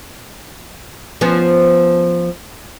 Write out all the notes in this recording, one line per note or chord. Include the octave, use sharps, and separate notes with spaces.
F3 B3 C#4